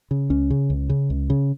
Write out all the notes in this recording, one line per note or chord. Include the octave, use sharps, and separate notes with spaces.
C#3
C#2 C#4
C#3
C#2
C#3
C#2
C#3